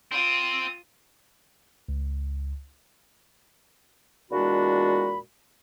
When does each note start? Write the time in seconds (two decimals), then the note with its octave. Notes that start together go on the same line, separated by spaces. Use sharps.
0.12 C4 F4 D#6
1.89 C#2
4.31 E2 A#2 G#3 D4 F#4 B5